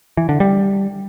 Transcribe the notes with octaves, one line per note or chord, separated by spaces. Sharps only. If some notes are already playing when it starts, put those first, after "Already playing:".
E3
D3
G3